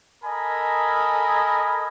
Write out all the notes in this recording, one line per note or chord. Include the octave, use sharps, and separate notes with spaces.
A4 A#4 D#5 G#5 B5